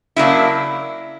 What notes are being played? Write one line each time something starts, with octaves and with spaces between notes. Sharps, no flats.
C#3 F#3 A#3 D4 E4